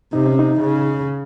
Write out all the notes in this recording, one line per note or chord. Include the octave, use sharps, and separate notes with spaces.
C3 D#4
C#4
D#4
C#3